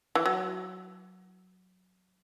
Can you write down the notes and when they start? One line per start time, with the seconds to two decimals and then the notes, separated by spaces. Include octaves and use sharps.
0.15 E3
0.26 F#3